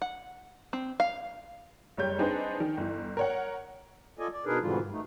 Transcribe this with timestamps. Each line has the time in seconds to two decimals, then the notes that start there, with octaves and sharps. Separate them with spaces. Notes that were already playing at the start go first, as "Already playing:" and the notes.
0.02 F#5
0.73 C4
1.00 F5
1.97 F#1 G3 C#5 G6
2.19 C4 D4 D#4 G#4 B4 C5
2.60 D#3
2.77 G1 E3
3.17 A#4 C#5 F#5
4.19 F4 A4 D5 D#5 G#5
4.33 D5
4.46 B2 D4 D#4 G#4 A#4 B4
4.62 G#2 B2 D3 E3 G3 F4
4.80 G2
4.92 A3 D#4